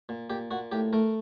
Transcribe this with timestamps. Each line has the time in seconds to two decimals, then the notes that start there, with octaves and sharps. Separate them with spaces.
0.09 A#2
0.30 A#2 G4
0.51 A#2 F#4
0.72 A2 G4
0.93 A3 A#4